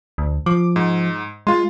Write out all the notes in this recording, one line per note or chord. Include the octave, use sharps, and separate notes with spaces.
D2
F3 D6
G#2
G#3 F4 C6